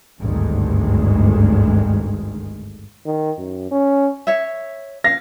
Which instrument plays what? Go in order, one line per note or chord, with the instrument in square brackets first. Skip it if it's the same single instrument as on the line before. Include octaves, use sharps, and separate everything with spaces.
[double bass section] G#1 D2 G2 D#3 G#3
[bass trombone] D#3
F#2
C#4
[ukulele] C#5 E5
[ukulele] F5 [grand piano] A#6